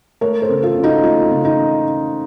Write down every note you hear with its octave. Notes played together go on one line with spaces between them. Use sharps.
A3 A#4 C#5
A4 C5
C#3
F4 A4
C#3
D#4 F#4
A3 F4
C#3
D#4